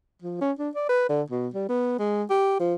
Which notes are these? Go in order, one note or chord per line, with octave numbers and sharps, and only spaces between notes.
F3
C#4
D4
D5
B4
D3
B2
G3
B3
G#3
G4
F3